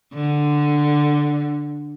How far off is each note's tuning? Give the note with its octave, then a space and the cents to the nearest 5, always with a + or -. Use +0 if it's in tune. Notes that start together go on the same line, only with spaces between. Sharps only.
D3 +5